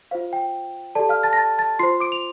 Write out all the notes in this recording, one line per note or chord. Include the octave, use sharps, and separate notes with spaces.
F4 C5 F5
G5
G4 A4 D5 A5
F5 F6
A5 A6
A#6
A5 A6
A5 A6
F4 C5 C6 C7
D6 D7
F7